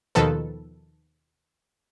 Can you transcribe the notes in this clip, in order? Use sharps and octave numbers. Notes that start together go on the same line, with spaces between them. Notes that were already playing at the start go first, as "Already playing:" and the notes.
D#2 B2 D#3 F3 A4 B4